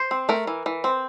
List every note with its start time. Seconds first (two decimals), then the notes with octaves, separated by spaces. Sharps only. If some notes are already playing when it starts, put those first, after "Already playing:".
Already playing: C5
0.11 C4
0.29 A3 A#4
0.47 E3
0.66 E3
0.84 C4